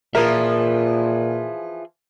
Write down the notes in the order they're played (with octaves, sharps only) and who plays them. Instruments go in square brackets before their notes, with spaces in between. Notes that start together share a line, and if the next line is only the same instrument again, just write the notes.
[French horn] A#2 [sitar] E3 F3 [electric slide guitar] F4 G#4 E5 [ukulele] A#4